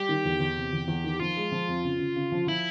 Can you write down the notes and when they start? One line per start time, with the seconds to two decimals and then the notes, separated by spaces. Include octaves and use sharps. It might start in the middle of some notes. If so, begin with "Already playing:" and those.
Already playing: G3 G4
0.09 D#3
0.25 E2
0.40 E2
0.57 C3
0.73 E2
0.88 E2
1.04 D#3
1.20 F3 F4
1.37 G#3
1.52 F3
1.68 F2
1.84 C#3
1.99 C#3
2.16 C#3
2.32 F3
2.47 F3 E4